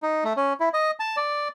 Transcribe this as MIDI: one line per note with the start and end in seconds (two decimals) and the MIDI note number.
0.03 0.24 63
0.24 0.33 57
0.37 0.53 61
0.60 0.69 64
0.73 0.91 75
1.00 1.16 81
1.17 1.48 74